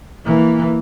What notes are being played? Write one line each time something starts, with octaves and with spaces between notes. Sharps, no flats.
E3 A#3